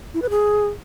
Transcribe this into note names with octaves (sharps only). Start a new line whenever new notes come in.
E4
B4
G#4